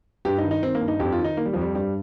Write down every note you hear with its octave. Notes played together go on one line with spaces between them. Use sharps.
G2 G4
D#4
D#3
D#4
D#3 C4
A#3
G2
D#4
F2 G4
F4
D#3
D#4
D#3 A#3
G3
F2 F3
G3
G2 G3